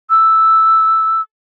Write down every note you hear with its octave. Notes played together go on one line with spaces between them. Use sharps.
E6